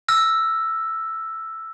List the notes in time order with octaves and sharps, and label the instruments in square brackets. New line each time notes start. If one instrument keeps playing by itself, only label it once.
[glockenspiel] E6 F6 A#6